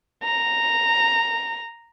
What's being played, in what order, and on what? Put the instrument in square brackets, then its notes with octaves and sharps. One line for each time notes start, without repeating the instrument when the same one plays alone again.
[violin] A#5